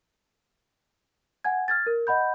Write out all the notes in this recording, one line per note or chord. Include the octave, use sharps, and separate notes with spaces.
F#5 G#5 G#6
F6 G#6 A6
A#4
D#5 F#5 B5 G6